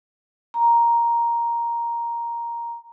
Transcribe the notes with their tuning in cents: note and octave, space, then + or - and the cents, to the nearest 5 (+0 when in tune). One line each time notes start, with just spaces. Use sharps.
A#5 +5